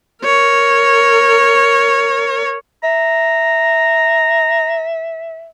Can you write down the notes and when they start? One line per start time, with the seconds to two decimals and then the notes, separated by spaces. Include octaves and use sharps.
0.24 A#4 C#5
2.84 E5 A#5